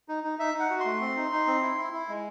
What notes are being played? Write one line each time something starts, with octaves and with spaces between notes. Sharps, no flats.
D#4
D#4
D#4 E5
D#4
F#5
F#4
C6
A3
C4
D#4
D#4
C4
E4
E4
E4
G#3